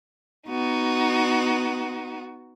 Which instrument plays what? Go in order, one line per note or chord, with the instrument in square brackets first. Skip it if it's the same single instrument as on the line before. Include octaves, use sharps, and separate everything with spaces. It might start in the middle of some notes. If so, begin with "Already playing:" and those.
[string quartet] B3 D#4 F#4